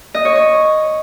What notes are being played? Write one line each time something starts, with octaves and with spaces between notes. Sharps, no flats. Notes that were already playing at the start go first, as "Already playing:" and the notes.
D#5
C#5
C#5